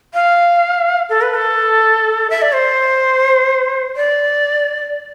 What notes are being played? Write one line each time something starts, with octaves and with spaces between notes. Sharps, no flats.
F5
A4
B4
A4
E5
D5
C5
D5